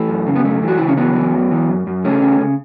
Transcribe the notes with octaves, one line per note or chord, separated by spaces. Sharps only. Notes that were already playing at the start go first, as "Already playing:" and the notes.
Already playing: E3 A3
F#2
C#3
B3
F#2 A3
E3
F#4
C#3 E4
C#4
E3 F#3 B3
E3
F#2
E3
F#2
F#2
C#3 A3 C#4
C#3
C#3